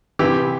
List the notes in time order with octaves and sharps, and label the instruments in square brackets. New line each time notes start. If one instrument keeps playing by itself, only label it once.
[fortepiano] C2 C3 E3 G4